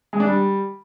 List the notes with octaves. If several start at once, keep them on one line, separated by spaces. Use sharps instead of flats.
G#3
D4
G3